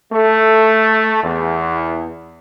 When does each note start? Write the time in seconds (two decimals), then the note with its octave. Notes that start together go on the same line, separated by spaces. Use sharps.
0.11 A3
1.23 E2